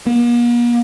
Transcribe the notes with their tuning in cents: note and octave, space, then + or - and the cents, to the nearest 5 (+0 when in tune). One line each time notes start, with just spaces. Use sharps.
A#3 +45